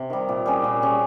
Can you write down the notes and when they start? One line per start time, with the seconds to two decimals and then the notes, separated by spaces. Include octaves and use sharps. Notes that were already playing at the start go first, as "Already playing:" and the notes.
Already playing: C3
0.10 D#3 G3
0.29 A#2
0.46 G3 C#4 G#4
0.64 A#2
0.82 G3 C#4 G#4